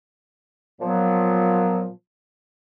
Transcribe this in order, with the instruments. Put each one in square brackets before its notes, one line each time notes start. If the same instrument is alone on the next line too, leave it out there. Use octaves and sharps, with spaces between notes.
[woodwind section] A#2 F3 F#3 B3